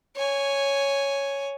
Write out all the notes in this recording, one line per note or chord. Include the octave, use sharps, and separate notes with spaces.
C#5 G#5